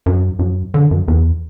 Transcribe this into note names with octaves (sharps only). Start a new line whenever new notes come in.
F#2
F#2
D3
F#2
E2